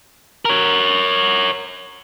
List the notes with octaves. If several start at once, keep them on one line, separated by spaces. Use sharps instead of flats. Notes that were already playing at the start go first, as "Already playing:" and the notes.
A#4 C#5